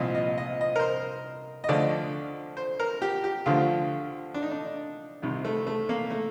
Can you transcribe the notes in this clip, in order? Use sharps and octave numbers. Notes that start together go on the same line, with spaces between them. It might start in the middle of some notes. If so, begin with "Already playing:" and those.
Already playing: C2 A#2 F3 D#5
D#5
D#5
D#5
A#4
C5
D#5
D2 D3 F3 D5
C5
A#4
G4
G4
D2 D3 F3 F4
D4
D#4
D4
C2 C3 D#3
A3
A3
A#3
A3